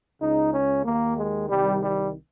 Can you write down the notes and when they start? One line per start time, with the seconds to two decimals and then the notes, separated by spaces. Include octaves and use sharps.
0.20 C#2 C#3 D#4
0.53 C#4
0.84 D#2 D#3 A#3
1.17 G#3
1.49 C2 C3 D#3 G3
1.82 G3